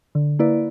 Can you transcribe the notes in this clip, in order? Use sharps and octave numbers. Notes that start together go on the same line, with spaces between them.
D3
A#3 E4 B4 D5